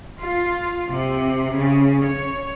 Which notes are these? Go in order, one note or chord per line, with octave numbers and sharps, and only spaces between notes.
F4
C3
C#3
C#5